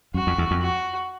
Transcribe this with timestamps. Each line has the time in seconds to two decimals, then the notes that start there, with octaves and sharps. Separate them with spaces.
0.14 F#2 F#4
0.27 F2
0.38 E2
0.51 F2
0.62 F#4